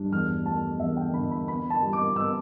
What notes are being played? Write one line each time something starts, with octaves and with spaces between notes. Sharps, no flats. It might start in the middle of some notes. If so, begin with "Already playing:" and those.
Already playing: G2 D4
E2 F6
A3 A5
E2 E5
G5
D3 B5
B5
B3 B5
A5
G3
D6
B3 E6